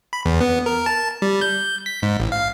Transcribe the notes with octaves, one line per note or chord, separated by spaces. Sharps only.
B5
E2
B3
A#4
A5
G3
G6
B6
G#2
A1
F5